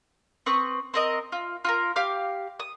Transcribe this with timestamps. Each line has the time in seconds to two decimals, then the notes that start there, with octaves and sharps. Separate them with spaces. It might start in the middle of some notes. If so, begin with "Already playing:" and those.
0.46 C4 B4 C#6 D#6
0.94 C4 A#4 D#5
1.32 F4
1.65 F4 F#4 A#4
1.96 G4 F5 D6 F6
2.60 D#6